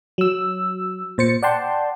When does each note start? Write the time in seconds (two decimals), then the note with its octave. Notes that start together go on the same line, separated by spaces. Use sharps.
0.18 F#3 E6
1.18 A#2 C5 A6 C#7
1.42 D5 F#5 G5 A5 C6